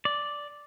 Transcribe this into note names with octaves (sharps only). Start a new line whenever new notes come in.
D5